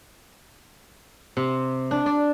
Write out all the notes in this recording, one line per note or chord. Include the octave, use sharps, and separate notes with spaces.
C3
D4
D5